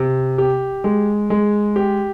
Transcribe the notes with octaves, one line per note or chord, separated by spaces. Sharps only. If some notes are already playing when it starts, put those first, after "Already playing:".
Already playing: C3
G4
G#3
G#3
G4